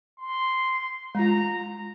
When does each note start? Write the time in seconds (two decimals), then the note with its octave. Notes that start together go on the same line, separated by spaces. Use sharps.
0.18 C6
1.15 G#3 F4 A#5